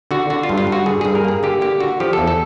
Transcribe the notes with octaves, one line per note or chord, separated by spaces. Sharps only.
D3 F#4
D3 F#4
F4
G2
F4
G2
F#4
D3 G#4
G2 G#4
A#4
A#3 G#4
D3 G4
A#3 G4
D3 F#4
F3 G4
E2 A4
A4